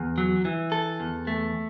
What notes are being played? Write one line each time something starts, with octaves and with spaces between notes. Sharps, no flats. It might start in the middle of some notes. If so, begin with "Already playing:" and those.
Already playing: E2
F#3
E3
A4
E2
A3